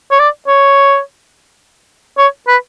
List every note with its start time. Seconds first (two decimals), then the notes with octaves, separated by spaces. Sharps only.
0.12 C#5
0.20 D5
0.48 C#5
2.18 C#5
2.48 B4